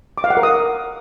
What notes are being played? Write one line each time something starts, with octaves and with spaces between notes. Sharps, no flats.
D6
F5
F#5
A#4
D#6